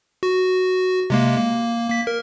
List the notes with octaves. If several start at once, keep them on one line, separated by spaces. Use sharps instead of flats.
F#4
C3 G#3 A#3
A#3
A#3 B6
A#4